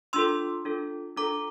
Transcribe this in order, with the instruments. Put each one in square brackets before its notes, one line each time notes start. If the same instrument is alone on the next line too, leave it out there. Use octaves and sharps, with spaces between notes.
[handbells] D4 F4 A4 C6 E6
D4 F4 A4
D4 F4 A4 A#5 D6